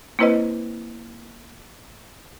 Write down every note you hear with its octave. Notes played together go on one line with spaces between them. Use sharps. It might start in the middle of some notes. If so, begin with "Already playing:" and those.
A#3 C4 E4 B4 C5 D#5